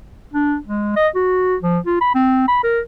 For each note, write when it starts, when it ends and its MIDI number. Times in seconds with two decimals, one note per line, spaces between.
0.34 0.57 62
0.67 0.94 56
0.97 1.08 75
1.15 1.56 66
1.63 1.79 53
1.86 1.96 65
2.01 2.12 83
2.15 2.48 60
2.48 2.59 83
2.63 2.80 70